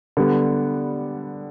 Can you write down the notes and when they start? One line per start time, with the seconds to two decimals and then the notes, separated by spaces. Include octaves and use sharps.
0.17 D3 G3 B3